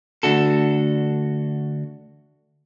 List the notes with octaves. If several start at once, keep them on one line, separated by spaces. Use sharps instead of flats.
D2 D4 F#4 A4